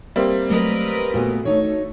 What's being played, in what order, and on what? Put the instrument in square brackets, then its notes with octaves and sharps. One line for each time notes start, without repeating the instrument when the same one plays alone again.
[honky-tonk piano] G3 A#3 C4 [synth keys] E5
[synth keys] F#3 A3 [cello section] A#4 B4 D#5
[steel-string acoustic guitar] A#2 A3 B3 [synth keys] F#4
[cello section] A3 [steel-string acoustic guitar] D#4 C#5